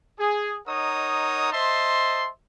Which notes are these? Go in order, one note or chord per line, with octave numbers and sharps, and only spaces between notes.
G#4
D#4 A#4 C#5 D#5 F#5 D#6
C5 D#5 E5 A5 C6